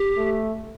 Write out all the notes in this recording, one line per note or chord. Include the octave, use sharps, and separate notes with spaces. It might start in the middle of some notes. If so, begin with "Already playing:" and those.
Already playing: G4
A3